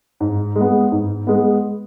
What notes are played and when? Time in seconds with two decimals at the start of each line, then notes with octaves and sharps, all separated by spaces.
0.20 G#2
0.56 G#3
0.61 B3
0.92 G#2
1.27 G#3 B3